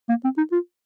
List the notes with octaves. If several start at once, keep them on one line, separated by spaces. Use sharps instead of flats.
A#3
C4
D#4
F4